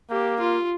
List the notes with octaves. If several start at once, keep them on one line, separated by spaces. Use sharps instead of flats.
A#3 G4
F4